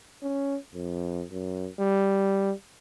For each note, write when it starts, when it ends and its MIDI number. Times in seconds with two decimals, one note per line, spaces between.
0.22 0.57 61
0.74 1.24 41
1.30 1.70 42
1.80 2.53 55